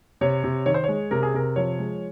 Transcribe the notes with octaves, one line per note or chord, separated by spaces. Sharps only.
C3 C#5
C3
D#3 C#5
C5
G#3 C#5
C3 A#4
G#4
C3 A#4
F3 C#5
G#3